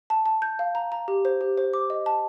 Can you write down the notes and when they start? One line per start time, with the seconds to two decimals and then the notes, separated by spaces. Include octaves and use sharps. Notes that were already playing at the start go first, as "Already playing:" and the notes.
0.10 A5
0.26 A5
0.42 G6
0.59 F5
0.75 A#5
0.92 A#5
1.08 G4
1.25 C5
1.41 G4
1.58 C5
1.74 D6
1.90 D#5
2.06 A5